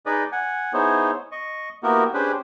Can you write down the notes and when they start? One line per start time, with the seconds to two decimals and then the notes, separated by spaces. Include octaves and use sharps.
0.06 D#4 G#4 B4 D5 D#5
0.32 F#5 G#5
0.73 B3 D#4 E4 G#4 C5 C#5
1.32 D#5 C#6
1.83 A#3 B3 E4 F#4 G4 A#4
2.14 C#4 D4 G4 G#4 B4 C5